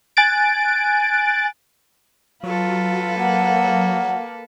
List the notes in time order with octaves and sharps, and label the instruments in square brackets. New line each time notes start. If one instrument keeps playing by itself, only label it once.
[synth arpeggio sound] G#5 F#6 A6 D7
[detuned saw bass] F#3 [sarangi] F4 [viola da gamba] A4 B4
[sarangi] A#3 [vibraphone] F#5